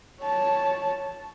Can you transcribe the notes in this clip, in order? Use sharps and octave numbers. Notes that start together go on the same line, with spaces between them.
C#5 A5